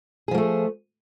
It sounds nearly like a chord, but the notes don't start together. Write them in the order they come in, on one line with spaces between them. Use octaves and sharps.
G#4 F3 A#3 A3